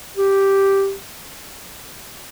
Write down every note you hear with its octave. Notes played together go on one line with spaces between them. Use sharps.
G4